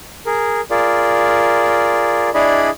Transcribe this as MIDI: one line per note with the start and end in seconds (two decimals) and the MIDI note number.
0.26 0.61 68
0.26 0.61 70
0.70 2.30 65
0.70 2.30 68
0.70 2.30 70
0.70 2.30 74
2.34 2.70 62
2.34 2.70 64
2.34 2.70 68
2.34 2.70 74
2.34 2.70 75
2.34 2.70 83